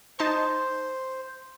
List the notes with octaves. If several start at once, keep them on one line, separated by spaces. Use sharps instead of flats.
D#4 C5 A5 C6